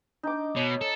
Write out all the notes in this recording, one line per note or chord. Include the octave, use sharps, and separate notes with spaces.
D4 D#4 D6
B2 C#5
A4